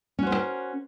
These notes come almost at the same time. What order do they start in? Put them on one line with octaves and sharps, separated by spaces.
C#4 F#4 C5 B3 A#4